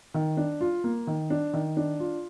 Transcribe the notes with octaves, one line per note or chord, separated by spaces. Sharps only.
D#3
D4
F4
A#3
D#3
D4
D#3
D4
F4